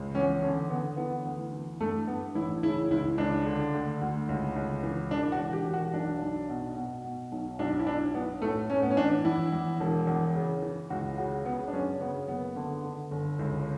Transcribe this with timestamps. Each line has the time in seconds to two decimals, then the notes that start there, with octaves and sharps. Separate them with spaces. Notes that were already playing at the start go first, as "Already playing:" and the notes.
Already playing: C#2
0.15 E2 C#4
0.42 D3 C#4
0.70 D3 B3
0.97 E3 B3
1.25 D2
1.53 E3
1.80 G2 A3
2.07 G2 B3
2.35 A1 E4
2.63 C#3 E4
2.90 C#2 E4
3.18 C#2 D4
3.46 D3
3.74 D2
4.01 D2
4.29 C#2
4.56 C#2
4.83 E3
5.11 E1 D4
5.32 F#4
5.38 E1
5.53 G4
5.66 E1
5.73 F#4
5.94 B1 D4
6.22 B1
6.49 B2
6.76 B2
7.04 B2
7.32 B1
7.59 B1 D4
7.79 E4
7.87 B1 D4
8.14 B1 B3
8.42 A2 A3
8.70 A2 C#4
8.82 B3
8.91 C#4
8.97 E3 D4
9.25 E2 E4
9.53 E2
9.80 E1
10.07 E2
10.35 C#3
10.62 E3
10.90 C#2 F#4
11.18 C#3 F#4
11.45 C#3 B3
11.68 D4
11.73 F#2 C#4
12.01 C#3 B3
12.28 F#1 B3
12.56 D3
12.83 D3
13.11 G1
13.39 C#2